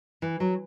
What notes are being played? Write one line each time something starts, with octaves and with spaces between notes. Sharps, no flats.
E3
F#3